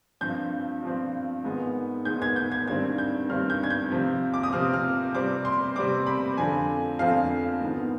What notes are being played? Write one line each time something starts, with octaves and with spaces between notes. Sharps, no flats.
G2 F3 C4 G6
G2 F3 C4
G#2 D#3 G#3 B3
G#2 D#3 G#3 B3 G6
G#6
G6
G#6
G2 D#3 G3 C4 G#6
G6
G2 D#3 G3 C4 F6
G6
G#6
G6
C3 F3 C4
D6
D#6
C3 F3 C4 F6
F6
C3 G3 C4 D6
C6
C3 G3 C4 D6
B5
F2 D3 F3 C4 G#5
F2 D3 F3 C4 F5
G#2 D#3 B3